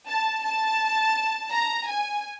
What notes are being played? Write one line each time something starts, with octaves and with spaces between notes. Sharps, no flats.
A5
A5
A#5
G#5